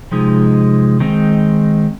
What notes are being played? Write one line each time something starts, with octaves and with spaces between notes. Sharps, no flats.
C3 F3 G#3 D#4
D#3 G#3 C4 D#4